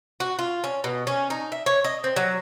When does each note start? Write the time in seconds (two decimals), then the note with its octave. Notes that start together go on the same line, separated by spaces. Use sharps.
0.20 F#4
0.39 F4
0.64 C#4
0.84 B2
1.07 C#4
1.30 D#4
1.52 E5
1.66 C#5
1.84 D#5
2.04 C4
2.16 F#3